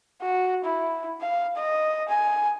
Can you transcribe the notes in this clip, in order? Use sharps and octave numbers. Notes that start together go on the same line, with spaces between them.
F#4
E4
F5
D#5
G#5